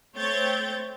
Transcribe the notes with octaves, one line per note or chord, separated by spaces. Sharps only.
A3 C4 C#5 G6 A6